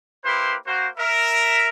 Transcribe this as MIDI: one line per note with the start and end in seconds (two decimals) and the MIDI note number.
0.25 0.56 58
0.25 0.56 64
0.25 0.56 67
0.25 0.56 71
0.25 0.56 72
0.25 0.56 84
0.67 0.88 58
0.67 0.88 66
0.67 0.88 72
0.98 1.69 70
0.98 1.69 76